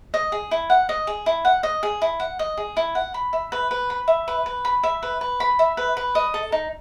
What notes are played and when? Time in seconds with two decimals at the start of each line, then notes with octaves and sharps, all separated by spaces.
0.14 D#5
0.32 G#4
0.51 E4
0.70 F#5
0.89 D#5
1.07 G#4
1.26 E4
1.45 F#5
1.63 D#5
1.83 G#4
2.02 E4
2.20 F#5
2.39 D#5
2.57 G#4
2.77 E4
2.95 F#5
3.14 B5
3.33 E5
3.52 B4
3.71 B4
3.90 B5
4.08 E5
4.28 B4
4.46 B4
4.65 B5
4.83 E5
5.03 B4
5.21 B4
5.40 B5
5.59 E5
5.77 B4
5.97 B4
6.15 D#5
6.34 A4
6.52 D#4